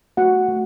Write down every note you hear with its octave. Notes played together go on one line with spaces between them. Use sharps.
A3 F#4 F#5
A3